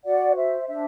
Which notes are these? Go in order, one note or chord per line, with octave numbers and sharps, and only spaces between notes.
F#4 D5 F#5
C5 E5
D4 E5